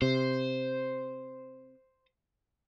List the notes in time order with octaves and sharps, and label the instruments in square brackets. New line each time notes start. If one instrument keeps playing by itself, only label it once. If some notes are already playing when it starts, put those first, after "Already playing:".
[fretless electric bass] C3 [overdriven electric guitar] C5